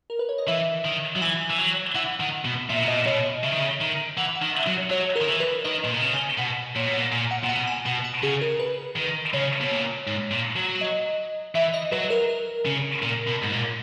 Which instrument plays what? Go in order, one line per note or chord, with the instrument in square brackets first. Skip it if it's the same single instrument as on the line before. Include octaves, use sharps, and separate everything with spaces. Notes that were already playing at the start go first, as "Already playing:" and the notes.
[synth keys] A#4
B4
C#5
D#5
[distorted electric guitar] E3 [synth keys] E5
[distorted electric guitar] D#3
F#3
[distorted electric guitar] E3 [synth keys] G#5
[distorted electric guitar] E3
F#3
[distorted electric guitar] E3 [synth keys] F#5
[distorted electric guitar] D#3
B2
[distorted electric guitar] A#2 [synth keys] E5
[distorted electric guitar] B2
[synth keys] D#5
[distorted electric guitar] A#2
[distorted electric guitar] B2 [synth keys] C#5
[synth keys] D#5
[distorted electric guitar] C#3 [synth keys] E5
[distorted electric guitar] D#3
C#3
D#3
[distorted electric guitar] E3 [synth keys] F#5
[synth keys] F#5
[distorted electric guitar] D#3
[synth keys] E5
[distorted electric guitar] F#3
[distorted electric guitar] F#3 [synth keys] C#5
[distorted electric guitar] D#3 [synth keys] A#4
[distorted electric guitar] E3
[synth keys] B4
[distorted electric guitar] D#3 [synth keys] D#5
[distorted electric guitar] A#2
B2
C#3
[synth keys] G#5
[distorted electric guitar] B2 [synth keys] F#5
[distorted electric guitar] A#2 [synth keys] C#5
[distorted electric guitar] B2
[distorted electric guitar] A#2 [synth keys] F#5
[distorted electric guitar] A#2 [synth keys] G#5
[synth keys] F#5
[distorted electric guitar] A#2
[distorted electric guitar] B2 [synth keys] F#5
[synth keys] G#5
[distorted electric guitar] B2 [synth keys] F#5
[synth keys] F#5
[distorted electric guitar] C#3 [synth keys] G#4
[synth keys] A#4
B4
[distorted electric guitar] D#3
[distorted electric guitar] C#3 [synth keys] C#5
[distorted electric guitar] B2
A#2
G#2
A#2
F#3
[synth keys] D#5
[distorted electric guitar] E3 [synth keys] E5
[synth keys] D#5
[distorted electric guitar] F#3 [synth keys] B4
[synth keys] A#4
A#4
[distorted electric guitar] C#3
[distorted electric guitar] A#2 [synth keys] A#4
[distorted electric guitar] B2
G#2
A#2